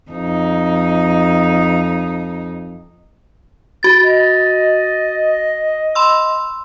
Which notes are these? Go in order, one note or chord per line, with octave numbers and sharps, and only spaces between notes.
F2 D#4
F#4 A6
D#5
B5 C6 E6